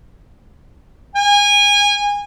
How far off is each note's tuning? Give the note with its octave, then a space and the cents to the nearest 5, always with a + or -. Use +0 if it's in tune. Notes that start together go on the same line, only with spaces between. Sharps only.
G#5 -25